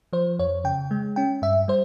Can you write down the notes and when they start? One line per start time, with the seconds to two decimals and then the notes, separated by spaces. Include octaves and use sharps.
0.13 F3 C5
0.39 F2 C#5
0.64 C#3 G5
0.91 G#3
1.16 C#4 G5
1.42 G2 E5
1.68 G3 C5